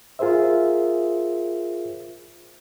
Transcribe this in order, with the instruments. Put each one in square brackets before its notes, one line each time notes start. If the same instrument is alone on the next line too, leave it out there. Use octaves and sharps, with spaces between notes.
[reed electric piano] F4 G#4 A#4 C5 E5